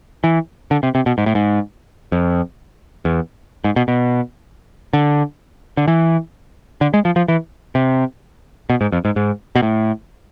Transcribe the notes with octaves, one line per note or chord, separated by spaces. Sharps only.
E3
D3
C3
C3
B2
G#2
A2
G#2
F2
E2
G#2
B2
B2
D3
D3
E3
D3
G#3
F3
F3
E3
C3
B2
G#2
F2
G#2
G#2
B2
A2